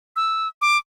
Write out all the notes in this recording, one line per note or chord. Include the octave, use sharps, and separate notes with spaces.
E6
D6